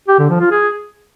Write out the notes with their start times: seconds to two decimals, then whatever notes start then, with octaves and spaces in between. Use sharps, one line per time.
0.08 G4
0.19 D3
0.30 F3
0.40 F4
0.51 G#4